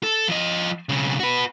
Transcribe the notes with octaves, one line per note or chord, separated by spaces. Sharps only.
A4
F3 D#5
B1 C#3
F#4 B4